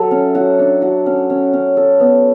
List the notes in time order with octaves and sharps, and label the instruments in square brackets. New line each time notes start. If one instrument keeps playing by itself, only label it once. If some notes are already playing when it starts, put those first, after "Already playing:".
Already playing: [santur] F#3 A4 E5
C#4
F#4
D4
F#4
C#4
C#4
C#4
A4
B3